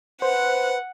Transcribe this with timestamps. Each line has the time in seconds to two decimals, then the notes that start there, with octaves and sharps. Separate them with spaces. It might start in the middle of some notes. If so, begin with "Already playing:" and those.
0.22 B4 C5 F#5